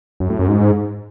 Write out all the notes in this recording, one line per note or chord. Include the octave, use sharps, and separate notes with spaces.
F#2
A2
F#2
G#2